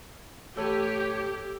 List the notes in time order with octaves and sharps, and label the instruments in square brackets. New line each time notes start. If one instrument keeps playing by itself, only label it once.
[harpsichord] A1 B4 [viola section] G4 [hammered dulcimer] A4 [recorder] C#5